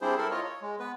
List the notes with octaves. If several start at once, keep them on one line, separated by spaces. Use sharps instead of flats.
G3 C4 D4 E4 G#4 C5
E4 A4 A#4
F4 C#5 D#5
C#5
G#3
B3 B4